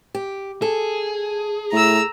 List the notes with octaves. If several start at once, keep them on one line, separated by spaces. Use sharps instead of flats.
G4
G#4 A4
A2 A#5 E6